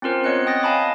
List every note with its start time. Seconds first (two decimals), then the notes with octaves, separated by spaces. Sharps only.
0.02 C4 C#4 F4 A#4 C5
0.24 B3 C4 C#5 D#5 F#6 C#7
0.47 G5 D#6 A6 A#6
0.63 D#5 F5 G#5 A5 B5 D6